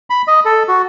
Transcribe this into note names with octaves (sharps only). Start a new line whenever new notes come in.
B5
D#5
A4
F#4